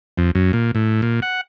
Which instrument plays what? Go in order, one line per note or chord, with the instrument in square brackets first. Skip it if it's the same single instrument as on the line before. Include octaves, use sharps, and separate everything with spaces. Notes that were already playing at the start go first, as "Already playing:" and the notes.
[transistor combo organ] F2
F#2
A#2
A2
A#2
F#5